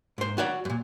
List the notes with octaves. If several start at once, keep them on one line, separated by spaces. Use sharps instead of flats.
G#2 C5
F#4 C#5 D5 F#5
F#2 A#2